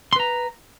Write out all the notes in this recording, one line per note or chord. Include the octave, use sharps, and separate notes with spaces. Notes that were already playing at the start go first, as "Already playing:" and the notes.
B4 A#5 C6